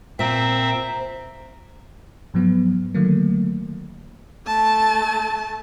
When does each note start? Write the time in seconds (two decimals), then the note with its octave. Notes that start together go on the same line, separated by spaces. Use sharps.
0.19 A#2 C4 C5 E5 A#5
2.34 G#2 F3 F#3 B3
2.94 D3 D#3 F#3 A3 A#3
4.47 A3 A5